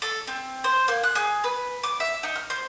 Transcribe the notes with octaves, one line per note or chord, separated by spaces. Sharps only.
A4
C4
C5
A#3
F#6
G#4
B4
D6
E5
D#4
F6
C5